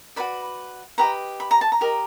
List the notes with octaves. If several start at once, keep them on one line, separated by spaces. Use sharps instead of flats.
F#4 B4 D5 B5
G4 B4 D#5 A#5
B5
A#5
A5
A#5
G4 A#4 D#5